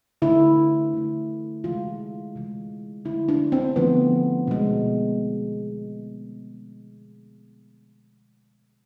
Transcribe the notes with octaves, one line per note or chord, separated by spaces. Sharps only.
D3 A3 E4
D3 A3
C3 E3 G#3 F4
C3 E3 G#3
D3 F3 A3 E4
D4
C4
D3 F3 A3 B3
B2 G#3